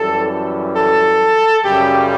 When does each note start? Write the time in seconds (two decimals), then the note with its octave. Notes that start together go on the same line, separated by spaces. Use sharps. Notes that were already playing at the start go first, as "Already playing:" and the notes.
Already playing: F#2 E3 G3 A4
0.77 A4
1.65 F#2 C#3 G3 G4